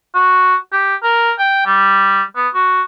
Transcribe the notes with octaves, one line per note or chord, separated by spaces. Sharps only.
F#4
G4
A#4
G5
G3
B3
F#4